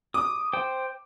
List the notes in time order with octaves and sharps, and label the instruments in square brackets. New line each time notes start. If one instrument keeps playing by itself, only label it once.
[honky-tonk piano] D6 [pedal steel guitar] D#6
[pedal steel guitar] C5 G5